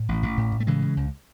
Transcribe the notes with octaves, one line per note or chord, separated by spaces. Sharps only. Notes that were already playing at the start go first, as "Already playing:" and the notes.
Already playing: A2
A1
A1
A2
A2
A3
C#3 E3 G#3
C#3
C#2